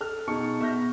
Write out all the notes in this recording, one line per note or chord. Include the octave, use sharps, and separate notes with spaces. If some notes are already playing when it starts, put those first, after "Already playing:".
A4 F6
B2 D#4 G#4 A5 C#6 C#7
B2 E5 C#6 F6 G6 A#6